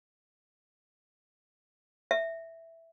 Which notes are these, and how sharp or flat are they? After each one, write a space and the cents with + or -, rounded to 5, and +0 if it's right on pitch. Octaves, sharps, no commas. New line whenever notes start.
E5 +0